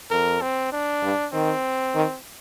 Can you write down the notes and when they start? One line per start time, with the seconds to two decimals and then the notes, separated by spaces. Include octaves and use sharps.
0.11 F2 A#4
0.42 C4
0.72 D4
1.03 G2
1.33 D#3 C4
1.95 D#3